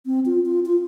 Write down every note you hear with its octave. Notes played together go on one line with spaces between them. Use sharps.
C4
F4
F4
F4